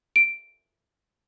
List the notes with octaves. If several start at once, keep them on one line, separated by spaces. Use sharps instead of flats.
D7